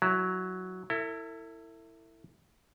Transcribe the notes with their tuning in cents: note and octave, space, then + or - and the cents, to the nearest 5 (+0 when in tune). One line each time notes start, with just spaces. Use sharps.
F#3 +0 E4 +0
E4 +0 A4 +45